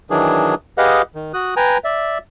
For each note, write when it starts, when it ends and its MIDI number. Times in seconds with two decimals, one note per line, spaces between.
0.10 0.55 51
0.10 0.55 52
0.10 0.55 54
0.10 0.55 62
0.10 0.55 68
0.78 1.02 67
0.78 1.02 68
0.78 1.02 71
0.78 1.02 75
0.78 1.02 77
0.78 1.02 78
1.15 1.32 51
1.34 1.54 66
1.34 1.54 87
1.34 1.54 90
1.56 1.78 71
1.56 1.78 79
1.56 1.78 80
1.56 1.78 82
1.84 2.18 74
1.84 2.18 76